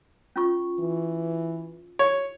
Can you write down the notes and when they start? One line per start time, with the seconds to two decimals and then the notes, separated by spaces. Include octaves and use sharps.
0.36 C#4 F4 C#6
0.79 E3
1.99 C#5